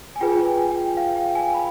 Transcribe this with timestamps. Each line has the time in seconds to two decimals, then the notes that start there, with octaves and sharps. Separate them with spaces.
0.16 G#5
0.20 F4 G#4 B4 G5
0.46 G#5
0.71 G5
0.97 F5
1.16 G5
1.35 G#5
1.54 B5